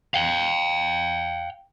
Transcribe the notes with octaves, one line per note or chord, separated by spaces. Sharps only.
F5 G5